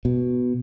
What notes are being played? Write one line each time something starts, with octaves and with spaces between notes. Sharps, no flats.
B2